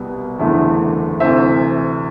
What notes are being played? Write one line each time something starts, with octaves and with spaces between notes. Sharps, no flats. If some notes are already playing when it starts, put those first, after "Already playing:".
Already playing: C2 B2 G3 B3
F#1 E2 D3 A3 E4
D2 C3 E3 C5 E5